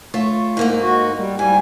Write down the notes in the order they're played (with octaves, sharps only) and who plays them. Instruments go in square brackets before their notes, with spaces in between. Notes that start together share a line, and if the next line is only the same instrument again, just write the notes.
[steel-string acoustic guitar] A3 F4 C#5
G#2 A#3 D#4
[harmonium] F#4
G3
[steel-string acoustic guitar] G#2 [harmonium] G3 G#5